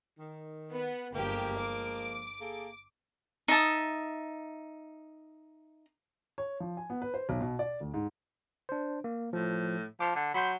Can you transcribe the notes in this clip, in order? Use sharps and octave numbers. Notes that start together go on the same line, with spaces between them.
D#3
B3
G1 F3 G#3 A#3 G4
D6
A#3 G#4 A4
D#4 E5 A5 D#6
C#5
F3
G#5
B3
B4
C5
B1
B2
D5
D2
G#2
D4 C5
A#3
A2 F3
F3 D6
D3
F#3 B5 C6 G6